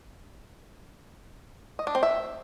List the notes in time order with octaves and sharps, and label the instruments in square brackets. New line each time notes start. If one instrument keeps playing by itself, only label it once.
[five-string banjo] D#5
D4
C4
E5